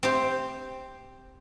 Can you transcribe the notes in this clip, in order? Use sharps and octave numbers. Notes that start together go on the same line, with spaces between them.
C4 G4 C5